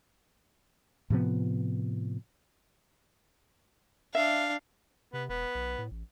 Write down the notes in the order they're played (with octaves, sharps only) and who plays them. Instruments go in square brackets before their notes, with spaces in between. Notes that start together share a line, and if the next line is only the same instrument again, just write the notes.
[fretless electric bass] A2 C3 F3 B3
[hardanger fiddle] D4 F5 [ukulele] E5
[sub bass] C3 [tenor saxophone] B3
[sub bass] E1 [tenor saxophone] B3
[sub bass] B1
A2
A1